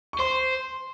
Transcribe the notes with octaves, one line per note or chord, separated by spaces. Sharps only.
C#6
C5 C6